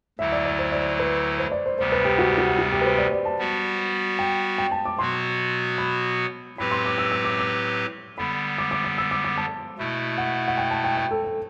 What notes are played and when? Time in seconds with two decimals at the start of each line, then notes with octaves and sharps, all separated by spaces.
0.19 D2 D3 F#3 A3 E4 E5
0.32 D5
0.46 D5
0.59 C5
0.72 D5
0.99 B4
1.38 C5
1.52 D5
1.66 C5
1.79 D2 C3 G3 B3 C5
1.92 B4
2.05 G4
2.18 F#4
2.29 G4
2.38 F#4
2.49 G4
2.59 F#4
2.72 G4
2.81 B4
2.85 C5
2.98 D5
3.12 D5
3.25 A5
3.39 G3 B3 F#4
4.19 G5
4.58 G5
4.72 A5
4.85 D6
4.98 B2 F#3 B3 F#4 C6
5.78 B5
6.58 A2 F#3 C4 G4 B4 B5
6.71 C6
6.85 D6
6.98 E6
7.12 E6
7.25 D6
7.38 D6
8.18 D3 G3 B3 B5
8.58 D6
8.71 D6
8.84 D6
8.98 E6
9.11 D6
9.24 D6
9.38 A5
9.78 B2 A3 E4
10.18 F#5
10.48 F#5
10.58 G5
10.71 A5
10.84 G5
10.97 G5
11.11 A4
11.24 A4